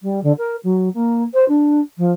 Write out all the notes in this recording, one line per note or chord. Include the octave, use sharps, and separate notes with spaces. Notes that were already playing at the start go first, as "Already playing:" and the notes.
G3
D3
A#4
F#3
A#3
C5
D4
F3